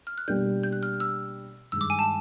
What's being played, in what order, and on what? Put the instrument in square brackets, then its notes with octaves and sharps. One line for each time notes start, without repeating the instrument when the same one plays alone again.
[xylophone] F6
F#6
[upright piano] B2 G3 A#3 D4 [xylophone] G6
[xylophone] G6
F#6
F6
E6
[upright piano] G2 D#3 G#3 [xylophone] E6
[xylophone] D6
G#5
A5